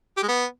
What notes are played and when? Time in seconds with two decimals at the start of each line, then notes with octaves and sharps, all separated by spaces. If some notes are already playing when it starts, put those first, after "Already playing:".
0.17 G4
0.23 G#3
0.28 B3